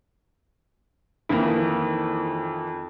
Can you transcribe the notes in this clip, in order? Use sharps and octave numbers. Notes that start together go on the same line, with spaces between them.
F2 D#3 E3 A#3 E4